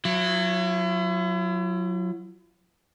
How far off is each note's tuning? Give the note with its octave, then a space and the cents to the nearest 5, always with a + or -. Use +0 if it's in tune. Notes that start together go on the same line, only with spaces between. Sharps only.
F#3 -20 E4 +40